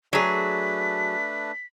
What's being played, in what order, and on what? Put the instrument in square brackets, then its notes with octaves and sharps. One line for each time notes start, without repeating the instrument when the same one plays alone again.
[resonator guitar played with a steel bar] F#3 G#4 [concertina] A3 D4 B4 [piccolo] B6